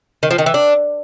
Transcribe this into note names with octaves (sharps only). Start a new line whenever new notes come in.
D#3
F3
D#3
E3
D4